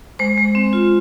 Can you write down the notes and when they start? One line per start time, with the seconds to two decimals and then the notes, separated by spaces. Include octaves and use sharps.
0.19 G#3 C5
0.38 G#3
0.55 C4
0.73 F4